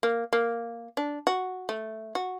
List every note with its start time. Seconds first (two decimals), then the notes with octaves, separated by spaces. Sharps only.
0.03 A#3
0.33 A#3
0.97 D4
1.27 F#4
1.69 A3
2.15 F#4